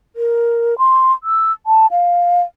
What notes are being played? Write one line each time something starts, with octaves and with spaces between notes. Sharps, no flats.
A#4
C6
E6
A5
F5